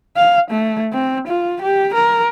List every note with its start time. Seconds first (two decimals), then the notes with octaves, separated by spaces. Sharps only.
0.17 F5
0.51 A3
0.93 C4
1.28 F4
1.62 G4
1.94 A#4